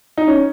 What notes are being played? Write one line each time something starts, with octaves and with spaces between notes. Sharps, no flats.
D#4
C#4